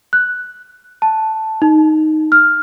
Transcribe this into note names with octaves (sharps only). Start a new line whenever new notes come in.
F#6
A5
D#4
F6